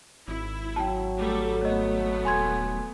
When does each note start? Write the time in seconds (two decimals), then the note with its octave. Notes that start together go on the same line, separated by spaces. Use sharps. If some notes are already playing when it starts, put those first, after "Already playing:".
0.28 G#1 E4
0.76 F#3 G5 A5
1.17 G3 A3 A4
1.61 A3 B3 C#5 D#5
2.25 D#1 G#5 C6 G#6